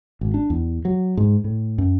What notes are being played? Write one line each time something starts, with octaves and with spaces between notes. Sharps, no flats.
G#1
D4
E2
F#3
G#2
A2
F#2